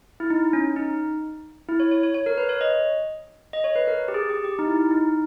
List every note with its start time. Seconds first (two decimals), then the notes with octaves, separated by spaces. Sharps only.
0.20 E4
0.30 D#4
0.53 C#4
0.76 D#4
1.69 E4
1.80 C#5
1.91 C#5
2.03 C#5
2.14 C#5
2.26 A#4
2.38 B4
2.49 C#5
2.61 D#5
3.53 D#5
3.64 C#5
3.76 B4
3.87 A#4
4.08 G4
4.14 G#4
4.29 G4
4.45 G4
4.59 D#4
4.67 E4
4.91 D#4